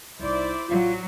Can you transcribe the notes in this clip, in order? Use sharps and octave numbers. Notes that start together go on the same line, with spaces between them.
C2 D#4 E4 C5 D5
A1 F#3 F4